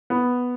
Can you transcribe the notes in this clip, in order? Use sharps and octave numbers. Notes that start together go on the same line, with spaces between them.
B3